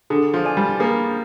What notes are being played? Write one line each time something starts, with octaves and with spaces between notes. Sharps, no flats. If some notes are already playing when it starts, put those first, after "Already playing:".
D3 G#4
F3
D5 G#5
G3
A#3 G#4